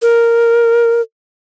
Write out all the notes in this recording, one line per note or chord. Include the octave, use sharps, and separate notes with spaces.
A#4